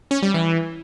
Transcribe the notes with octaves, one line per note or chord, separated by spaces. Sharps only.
C#4
G3
E3